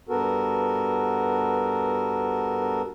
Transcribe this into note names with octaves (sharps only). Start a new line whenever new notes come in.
G2 B3 F#4 A4 A#4